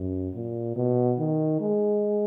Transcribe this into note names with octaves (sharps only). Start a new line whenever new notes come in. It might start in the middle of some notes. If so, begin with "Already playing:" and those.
Already playing: F#2
A#2
B2
D#3
G#3